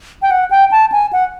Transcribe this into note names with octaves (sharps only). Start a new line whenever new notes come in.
G5
F#5
G5
A5
G#5
F#5